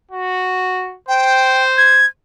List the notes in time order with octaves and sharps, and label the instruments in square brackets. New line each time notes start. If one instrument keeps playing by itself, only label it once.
[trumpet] F#4
[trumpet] C5 [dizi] G5
[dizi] G#6